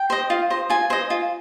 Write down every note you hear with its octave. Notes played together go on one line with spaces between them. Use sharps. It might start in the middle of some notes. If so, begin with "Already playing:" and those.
Already playing: G5
C5 D#5
F4
C5 D#5
F4 G#5
C5 D#5
F4